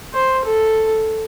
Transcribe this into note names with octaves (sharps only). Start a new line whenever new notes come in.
C5
A4